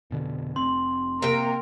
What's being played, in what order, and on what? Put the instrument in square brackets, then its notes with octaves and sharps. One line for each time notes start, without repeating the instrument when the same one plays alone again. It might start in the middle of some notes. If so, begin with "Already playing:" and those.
[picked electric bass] F1 B2 D3
[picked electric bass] F1 C4 [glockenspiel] C6
[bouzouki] C3 G5 [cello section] A#3 A#4